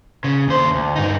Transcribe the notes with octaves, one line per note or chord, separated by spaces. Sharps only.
C#3
D#2 C5
D2
G2 D#4